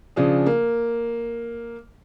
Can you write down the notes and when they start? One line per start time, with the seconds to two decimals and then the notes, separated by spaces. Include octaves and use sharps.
0.16 C#3 F3 D4 G#4
0.46 A#3